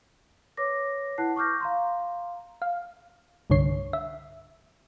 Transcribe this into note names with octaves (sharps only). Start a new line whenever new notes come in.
B4 C#5 D6 A#6
E4 B4 F#5 A5 F#6 C7
C#6 D6 F6 G6 A#6
F5 A#5 C6
F5
C2 G2 D3 C#5 C7
E5